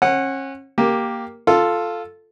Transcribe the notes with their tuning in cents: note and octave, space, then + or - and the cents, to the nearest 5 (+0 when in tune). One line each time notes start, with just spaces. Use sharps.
C#4 -35 F#5 +0
A#3 +0 G4 +0
F4 +0 A4 +0